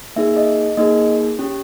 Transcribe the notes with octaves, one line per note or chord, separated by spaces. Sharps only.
A#3 D#4 G#4 E5
D#5
A#3 D#4 G#4 D#5
C#4 G4